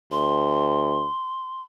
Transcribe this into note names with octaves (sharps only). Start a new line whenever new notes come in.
D2 C6